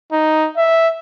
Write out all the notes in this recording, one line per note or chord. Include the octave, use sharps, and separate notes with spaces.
D#4
E5